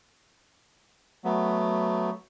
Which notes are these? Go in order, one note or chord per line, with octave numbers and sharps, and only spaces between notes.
F#3 A3 B3